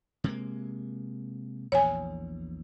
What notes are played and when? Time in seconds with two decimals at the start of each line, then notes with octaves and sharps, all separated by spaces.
0.24 C3 G#3 A#3
1.72 A#1 E2 C#5 G#5